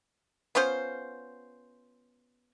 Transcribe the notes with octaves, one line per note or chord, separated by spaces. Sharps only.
B3 C#4 F4 C5